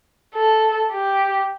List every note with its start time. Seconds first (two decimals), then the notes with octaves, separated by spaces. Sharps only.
0.35 A4
0.92 G4